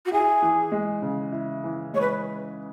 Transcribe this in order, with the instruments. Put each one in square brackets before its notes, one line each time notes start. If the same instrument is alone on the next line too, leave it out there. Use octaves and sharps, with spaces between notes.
[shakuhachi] F#4
[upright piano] E4 [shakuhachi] G#4
[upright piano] E3
G#3
C#3
E4
E3
[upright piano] G#3 [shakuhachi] C#5
[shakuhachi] B4